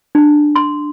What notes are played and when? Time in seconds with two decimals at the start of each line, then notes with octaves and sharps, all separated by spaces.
0.15 D4
0.56 C6